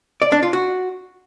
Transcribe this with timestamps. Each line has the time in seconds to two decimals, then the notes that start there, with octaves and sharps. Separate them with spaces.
0.22 D5
0.32 D4
0.43 F4
0.53 F#4